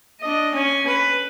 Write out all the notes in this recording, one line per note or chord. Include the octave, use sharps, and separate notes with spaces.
D4 D#5
C#4 G#5
B4